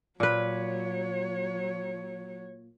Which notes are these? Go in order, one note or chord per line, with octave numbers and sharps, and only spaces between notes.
A#2 F#3 B4 C#5